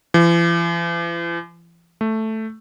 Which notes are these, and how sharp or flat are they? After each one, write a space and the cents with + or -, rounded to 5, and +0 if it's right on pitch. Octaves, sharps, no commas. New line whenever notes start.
E3 +45
A3 +0